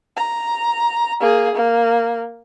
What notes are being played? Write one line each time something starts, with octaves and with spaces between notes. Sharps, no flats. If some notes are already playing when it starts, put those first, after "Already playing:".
A#5
A#3 G#4
A#3